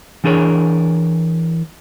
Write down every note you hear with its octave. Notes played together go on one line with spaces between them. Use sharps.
E3 D4 G#4 A#4 C#5